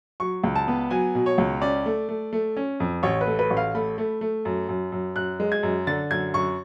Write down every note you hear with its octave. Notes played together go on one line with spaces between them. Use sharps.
F#3 C#6
C#2
A5
B3
F#3 G#5
B2
C#5
C#2
C#4 D5
A3
A3
A3
C#4
F2
A1 C#5
B4
A3
B4
A1
F5
A3 B5
A3
A3
F#2
F#2
F#2
F#2 F#6
G#3
G#6
F#2
D3 A6
F#2 G#6
F#2 C#6